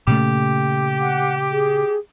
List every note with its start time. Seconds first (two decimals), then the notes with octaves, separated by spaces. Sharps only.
0.07 A#2 C#3 A3 G4
1.00 F#5
1.51 G#4